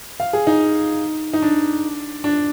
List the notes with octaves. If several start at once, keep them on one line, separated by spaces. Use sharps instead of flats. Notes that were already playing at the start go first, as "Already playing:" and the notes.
F5
G#4
D#4
D#4
D4
D4